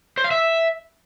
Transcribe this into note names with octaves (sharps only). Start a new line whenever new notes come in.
C5
F5
E5